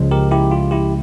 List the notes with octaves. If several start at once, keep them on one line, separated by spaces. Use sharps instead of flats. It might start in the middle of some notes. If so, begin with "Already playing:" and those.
Already playing: C#2 C#3 F3 G#3
G4 A#4
E4 G4
F4
E4 G4